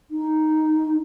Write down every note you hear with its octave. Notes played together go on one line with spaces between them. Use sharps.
D#4